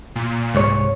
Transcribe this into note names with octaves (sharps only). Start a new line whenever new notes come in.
A#2
C2 G#2 C#5